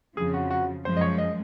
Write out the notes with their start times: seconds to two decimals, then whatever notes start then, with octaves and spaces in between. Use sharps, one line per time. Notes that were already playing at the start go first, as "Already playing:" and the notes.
0.16 F2 C#3 F3 G#4
0.34 F#4
0.51 F#4
0.85 F#2 F3 G#3 C5
0.97 D#5
1.01 C#5
1.18 D#5